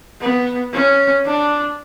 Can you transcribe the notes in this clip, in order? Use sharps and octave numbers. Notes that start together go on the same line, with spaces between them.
B3
C#4
D4